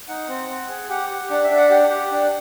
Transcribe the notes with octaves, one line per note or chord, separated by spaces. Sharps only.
D#4 F#5
C4
C4
G#4
G4 F#5
G4
D4 F#5
E5
D4
F#5
G4 F#5
G4
D4